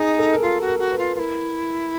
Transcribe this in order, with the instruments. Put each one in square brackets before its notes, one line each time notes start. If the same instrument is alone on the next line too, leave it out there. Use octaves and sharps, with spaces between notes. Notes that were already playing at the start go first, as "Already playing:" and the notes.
Already playing: [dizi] D#4 [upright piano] G#4
[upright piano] A4
A#4
[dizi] F4 [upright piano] A4
[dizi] F#4
[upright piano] A#4
[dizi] F#4
[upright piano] B4
[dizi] F4
[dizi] F4 [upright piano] A#4
[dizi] E4